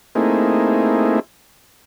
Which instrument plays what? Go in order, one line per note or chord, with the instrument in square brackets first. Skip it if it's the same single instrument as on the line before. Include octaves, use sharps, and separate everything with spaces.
[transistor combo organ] A3 A#3 C4 D#4 E4 G#4